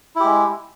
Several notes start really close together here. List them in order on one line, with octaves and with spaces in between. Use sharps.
E4 G4 G#3